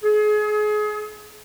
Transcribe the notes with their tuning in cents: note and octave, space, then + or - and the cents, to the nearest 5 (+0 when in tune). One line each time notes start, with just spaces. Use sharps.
G#4 +30